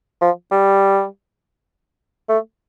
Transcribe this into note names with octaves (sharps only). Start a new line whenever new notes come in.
F3
G3
A3